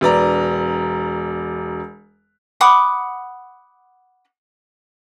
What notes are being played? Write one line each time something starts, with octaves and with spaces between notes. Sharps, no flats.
E1 B4 D5 A#5
F#5 B5 D6 D#6